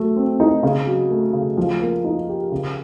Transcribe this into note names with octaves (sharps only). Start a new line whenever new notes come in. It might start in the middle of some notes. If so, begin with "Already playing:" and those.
Already playing: F#3 A3
C4
D#4
C#3
F#3
A3
C#3
F3
A#3
D#4
G4
C#3